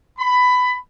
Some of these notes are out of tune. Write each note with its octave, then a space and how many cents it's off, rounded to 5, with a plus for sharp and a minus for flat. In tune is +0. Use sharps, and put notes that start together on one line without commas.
B5 +15